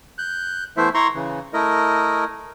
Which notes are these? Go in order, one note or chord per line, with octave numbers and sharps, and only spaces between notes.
F#6 G6
E3 A3 B3 E4 C5 E5
E4 A#5 C6 C#6
C#3 E3
A3 E4 A#4 D#5